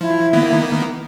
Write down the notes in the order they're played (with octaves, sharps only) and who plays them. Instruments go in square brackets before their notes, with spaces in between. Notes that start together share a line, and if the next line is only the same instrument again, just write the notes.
[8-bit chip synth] F3 [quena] E4
[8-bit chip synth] D#3 A#3 B3